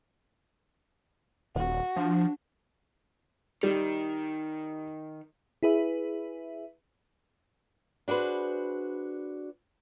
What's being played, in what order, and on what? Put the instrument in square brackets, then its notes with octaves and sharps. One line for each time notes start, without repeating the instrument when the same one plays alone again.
[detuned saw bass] D#1 [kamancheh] F#4
[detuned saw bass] F3 [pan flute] D4
[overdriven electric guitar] D#3 [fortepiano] G3
[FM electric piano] E4 G#4 B4 E5
[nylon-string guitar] D4 F#4 G#4 B4 C5